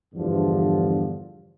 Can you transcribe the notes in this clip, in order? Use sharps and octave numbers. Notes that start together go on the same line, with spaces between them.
E2 G2 D3 F3